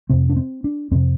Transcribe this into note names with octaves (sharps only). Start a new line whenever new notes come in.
F2 C3 C4
D4
C4
D4
F2 C3 C4